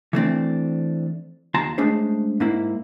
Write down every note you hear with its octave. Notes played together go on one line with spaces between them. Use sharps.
E3 A3 C4 D4
D#2 F4 A5 A#5 C6
G#3 A3 C#4 D4 G#4 C5
G#2 A#3 E4